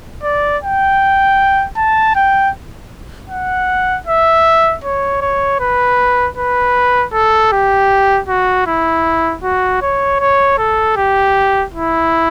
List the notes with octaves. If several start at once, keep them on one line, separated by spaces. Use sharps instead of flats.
D5
G5
A5
G5
F#5
E5
C#5
C#5
B4
B4
A4
G4
F#4
E4
F#4
C#5
C#5
A4
G4
E4